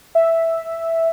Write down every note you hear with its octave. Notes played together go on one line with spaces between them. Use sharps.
E5